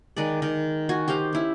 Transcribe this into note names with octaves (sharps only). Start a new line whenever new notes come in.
D#3 G#3 B4 D5
D#3
F#4 G#5
G4 C5 D#5 F5
C#4 E4